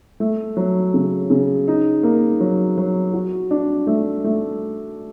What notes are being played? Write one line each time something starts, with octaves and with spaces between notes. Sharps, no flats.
A3
F#3
C#3
C#3
D#4
A#3
F#3
F#3
F#4
D4
A3
A3